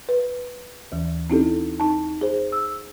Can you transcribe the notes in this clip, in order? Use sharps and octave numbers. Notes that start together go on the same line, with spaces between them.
B4
D#2 E3
C4 C#4 D#4 E4 G4 A4
D#4 A5
G#4 C5
E6